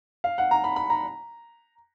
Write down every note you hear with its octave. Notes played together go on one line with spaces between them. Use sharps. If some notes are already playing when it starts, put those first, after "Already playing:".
F5
F#5
A#5
B5
B5
A#5